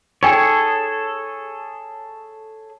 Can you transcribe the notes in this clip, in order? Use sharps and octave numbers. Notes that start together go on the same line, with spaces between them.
D#4 G#4 A4 C#5 G5 G#5